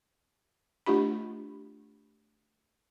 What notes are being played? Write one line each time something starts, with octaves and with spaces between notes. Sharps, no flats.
A3 D4 F4 G4 B5